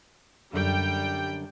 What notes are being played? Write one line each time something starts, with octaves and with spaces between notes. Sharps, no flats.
F#2 D3 G3 G5